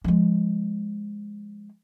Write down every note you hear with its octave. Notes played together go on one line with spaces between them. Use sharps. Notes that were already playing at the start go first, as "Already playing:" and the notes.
F3 G#3